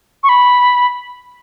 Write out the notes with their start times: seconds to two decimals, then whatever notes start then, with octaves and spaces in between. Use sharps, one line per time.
0.23 C#6
0.29 B5